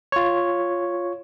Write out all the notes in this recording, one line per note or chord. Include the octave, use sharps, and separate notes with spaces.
F4 C#5